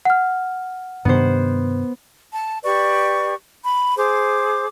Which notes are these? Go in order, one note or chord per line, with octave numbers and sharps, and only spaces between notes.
F#5 F6
G2 C3 D#3 B3 C5
A5
G4 B4 D5 C#6
B5
G#4 C5 D6